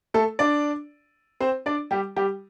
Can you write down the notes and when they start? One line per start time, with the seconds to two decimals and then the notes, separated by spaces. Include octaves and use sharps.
0.14 A3 A4
0.39 D4 D5
1.40 C4 C5
1.66 D4 D5
1.91 G3 G4
2.17 G3 G4